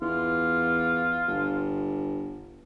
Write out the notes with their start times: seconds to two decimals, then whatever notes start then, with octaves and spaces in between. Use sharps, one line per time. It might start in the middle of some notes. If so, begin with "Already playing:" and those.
0.02 E2 F4
1.28 G1